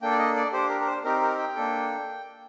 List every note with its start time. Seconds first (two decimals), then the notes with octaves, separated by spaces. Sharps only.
0.02 A#3 D4 A4 G5
0.11 D5
0.19 D#5
0.36 D5
0.52 D4 G4 C5
0.69 A#4
0.80 A#4
0.87 C5
1.04 C4 D#4 G4 A#4
1.22 A#4
1.38 G5
1.56 A#3 D4 A4